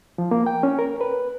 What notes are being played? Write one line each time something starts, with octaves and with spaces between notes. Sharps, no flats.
F3
A#3
G5
C#4
A#4
B4